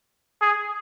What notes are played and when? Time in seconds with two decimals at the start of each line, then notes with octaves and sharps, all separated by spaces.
0.41 G#4